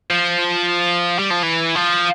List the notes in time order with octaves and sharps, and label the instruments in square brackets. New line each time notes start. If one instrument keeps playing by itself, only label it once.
[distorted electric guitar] F3
G3
F3
E3
F3